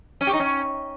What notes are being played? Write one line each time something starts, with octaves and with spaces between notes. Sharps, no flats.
C#4
G4
D#4
C#4